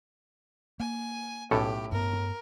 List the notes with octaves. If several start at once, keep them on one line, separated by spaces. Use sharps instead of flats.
A#3 G#5
B1 A2 C#4 G4 A4
G2 B3 A#4